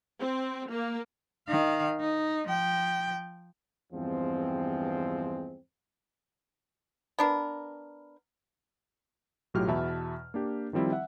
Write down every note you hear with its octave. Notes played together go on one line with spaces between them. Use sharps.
C4
A#3
D#3 F5
D#4
F3 G5
E2 G2 F3 G#3 C4
B3 D4 A#4
B1 A2 F#3 F4 G4 F6
E2 B2 E5 A5 B5
A#3 D4 G4
D#3 F3 G3 C4 E4
E5 F#5